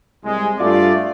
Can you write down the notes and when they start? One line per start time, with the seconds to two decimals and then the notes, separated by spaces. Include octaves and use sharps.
0.24 C2 G#3
0.58 G2 A3 F4 D5